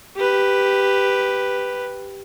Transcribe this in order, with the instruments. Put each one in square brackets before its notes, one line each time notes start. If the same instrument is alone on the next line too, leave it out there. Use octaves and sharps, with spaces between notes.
[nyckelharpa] G4 B4